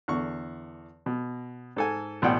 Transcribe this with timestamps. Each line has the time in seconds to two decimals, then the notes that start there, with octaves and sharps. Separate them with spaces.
0.08 E2 D3 C#6
1.06 B2
1.76 G#2 A4 G#5
2.22 A1 B2 D5 F#5 G5